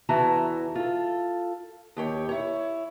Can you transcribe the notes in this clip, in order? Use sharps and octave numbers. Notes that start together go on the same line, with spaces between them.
E2 E3 F#4 E5 A5 A#5
F4 A4
D#2 G4 C#5
E4 C#5